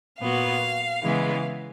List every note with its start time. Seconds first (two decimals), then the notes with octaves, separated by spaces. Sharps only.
0.21 A#2 F#3 B3 F5
1.03 C#3 E3 G#3 B3